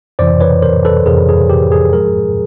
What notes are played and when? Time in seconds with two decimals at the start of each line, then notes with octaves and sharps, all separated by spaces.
0.19 F2 C3 E3 C5 D5
0.41 B4 C#5
0.62 A#4 C5
0.85 A4 B4
1.06 F2 C3 E3 G#4 A#4
1.29 G#4
1.49 G4
1.72 G#4
1.93 G#2 F3 G#3 G#4 A#4